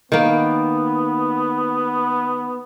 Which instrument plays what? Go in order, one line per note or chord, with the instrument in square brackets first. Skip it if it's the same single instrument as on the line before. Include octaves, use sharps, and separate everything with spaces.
[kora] D#3 A#3 [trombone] B3